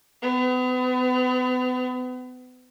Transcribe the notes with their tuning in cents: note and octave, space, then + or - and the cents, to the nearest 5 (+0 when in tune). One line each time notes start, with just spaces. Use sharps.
B3 +35